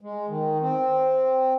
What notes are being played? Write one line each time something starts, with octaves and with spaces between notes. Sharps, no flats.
G#3
D#3
C4